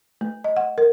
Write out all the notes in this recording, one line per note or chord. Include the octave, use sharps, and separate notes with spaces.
A3
D#5
F#5
A#4